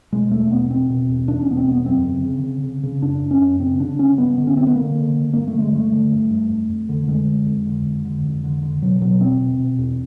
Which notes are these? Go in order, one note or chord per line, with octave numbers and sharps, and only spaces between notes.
B2 G#3
E2 A3
B2 B3
E2 C4
B2
E2
E2 D4
C#4
B2 B3
C4
E2
B3
F#2 C4
C#3
C#3
C#3
C#3
C#3
F#2 D4
F#2
C#4
F#2
C#3 C4
C#3 D4
C#3 C#4
G2 B3
D3
C#4
D3 C4
B3
D3 A#3
D3
D3
G2 A#3
A3
D3
G#3
G2 A3
D3
G2
G2
F2
F2
D3
D3 G#3
F2
F2
D3
F2
D3
F2
D3
D3
B2 F#3
B2 F#3
E2 C4
B2
B2
E2